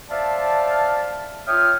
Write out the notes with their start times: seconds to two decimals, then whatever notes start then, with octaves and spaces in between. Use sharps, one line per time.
0.10 C5 D5 E5 F5 A5
1.47 F4 C#5 E5 G5 D#6 F6